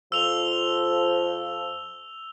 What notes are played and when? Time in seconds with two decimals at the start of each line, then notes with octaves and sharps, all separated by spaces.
0.12 F2 F3 E6 F7 G7